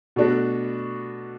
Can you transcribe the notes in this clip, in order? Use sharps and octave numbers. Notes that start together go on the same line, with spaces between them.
B2 A3 D4 F#4